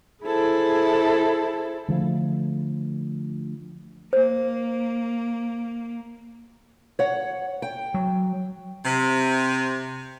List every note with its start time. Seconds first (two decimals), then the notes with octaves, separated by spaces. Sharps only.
0.24 E4 G#4 A4 C5
1.88 D3 F3 A3
4.13 A#3 C5
6.99 C#5 F#5
7.62 G5
7.94 F#3
8.85 C3